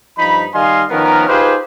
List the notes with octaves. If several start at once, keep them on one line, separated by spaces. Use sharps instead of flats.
G2 F3 D#4 B5
D#3 G3 D#5 F5 G#5 C6
D#3 F3 B3 C#4 A#4
D#4 F4 G4 G#4 B4 C5